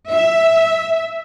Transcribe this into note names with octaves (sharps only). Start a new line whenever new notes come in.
E5